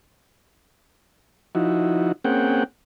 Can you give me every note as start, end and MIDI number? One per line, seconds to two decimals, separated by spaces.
1.55 2.12 53
1.55 2.12 63
1.55 2.12 64
1.55 2.12 66
2.24 2.64 58
2.24 2.64 60
2.24 2.64 61
2.24 2.64 68
2.24 2.64 78
2.24 2.64 79